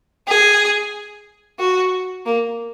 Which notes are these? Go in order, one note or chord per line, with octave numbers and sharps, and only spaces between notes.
G#4
F#4
A#3